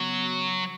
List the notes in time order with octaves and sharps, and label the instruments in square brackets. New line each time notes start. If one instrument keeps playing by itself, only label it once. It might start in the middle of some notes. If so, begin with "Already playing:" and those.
Already playing: [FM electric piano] C#3 B3 [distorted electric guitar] F#3